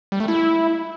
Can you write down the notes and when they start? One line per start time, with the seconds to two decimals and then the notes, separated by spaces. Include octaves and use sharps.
0.12 G3
0.20 A3
0.28 E4